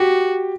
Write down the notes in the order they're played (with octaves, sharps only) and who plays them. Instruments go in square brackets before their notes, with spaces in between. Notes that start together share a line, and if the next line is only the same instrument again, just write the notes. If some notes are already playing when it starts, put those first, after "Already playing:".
Already playing: [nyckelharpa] F#4 [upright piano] G4